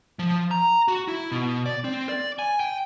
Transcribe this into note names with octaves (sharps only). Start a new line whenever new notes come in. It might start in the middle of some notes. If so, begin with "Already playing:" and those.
F3
A#5
F#4
E4
B2
D5
C4
D5
G#5
G5